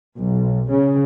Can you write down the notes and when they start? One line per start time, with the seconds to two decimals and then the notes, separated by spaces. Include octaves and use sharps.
0.18 B1
0.70 C#3